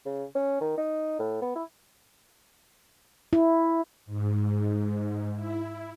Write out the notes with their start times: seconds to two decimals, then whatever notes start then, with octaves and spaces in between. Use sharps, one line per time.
0.05 C#3
0.35 C#4
0.61 D#3
0.78 D#4
1.19 A2
1.42 B3
1.56 E4
3.33 E4
4.06 G#2
5.34 E4